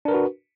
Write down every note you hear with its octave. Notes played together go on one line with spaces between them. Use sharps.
D4 F#4 A#4 B4